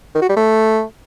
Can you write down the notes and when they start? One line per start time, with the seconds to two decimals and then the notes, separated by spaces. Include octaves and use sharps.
0.14 D#3
0.22 F#4
0.29 G3
0.36 A3